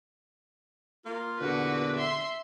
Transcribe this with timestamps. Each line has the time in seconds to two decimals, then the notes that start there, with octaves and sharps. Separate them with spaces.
1.05 A#3 F4
1.39 E2 A#2 D3 F#4 B4
1.96 E5 C6